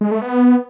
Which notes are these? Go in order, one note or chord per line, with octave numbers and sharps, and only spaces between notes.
G#3
A3
B3